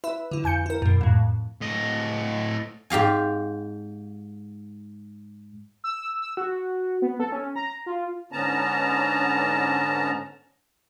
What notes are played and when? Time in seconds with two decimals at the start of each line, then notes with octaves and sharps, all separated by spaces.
0.04 E4 B4 E5
0.31 D3 E4
0.44 F2 G#5 G6 C#7
0.66 E4 A#4
0.82 F#2 B2
1.01 F2 A2
1.61 A2 D#5
2.90 G#2 G4 F5 G#5
5.84 E6
6.21 E6
6.37 F#4
7.02 B3
7.20 A4
7.32 C#4
7.56 A#5
7.86 F4
8.32 G#2 D3 B3 C#4 A5 A#5